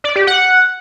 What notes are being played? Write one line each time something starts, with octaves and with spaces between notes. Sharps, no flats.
D5
G4
F#5